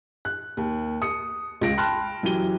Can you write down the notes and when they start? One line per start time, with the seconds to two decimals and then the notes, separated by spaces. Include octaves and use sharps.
0.25 F#6
0.57 D#2
1.02 D#6 C#7
1.61 C#2 F4 A#6 D7
1.78 G5 A5 B5 C6 F6 F#6
2.23 F#2 E3 F#3 G4 D#7 G7